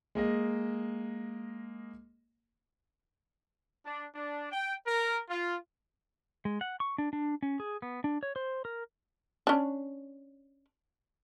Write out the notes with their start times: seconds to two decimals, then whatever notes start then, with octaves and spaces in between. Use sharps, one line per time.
0.15 G#3 A#3 D#5
3.85 D4
4.15 D4
4.51 G5
4.87 A#4
5.29 F4
6.45 G#3
6.61 F#5
6.80 C#6
6.98 D4
7.13 D4
7.43 C#4
7.60 G#4
7.82 B3
8.04 D4
8.23 C#5
8.36 C5
8.65 A#4
9.47 C#4 D4